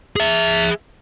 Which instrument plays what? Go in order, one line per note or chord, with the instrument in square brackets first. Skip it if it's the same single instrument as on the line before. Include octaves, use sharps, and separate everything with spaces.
[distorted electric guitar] G#4 E5